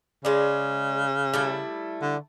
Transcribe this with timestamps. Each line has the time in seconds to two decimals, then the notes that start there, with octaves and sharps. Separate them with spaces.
0.25 C#3 G#3 D5
1.34 G3 A3 E4
2.02 D3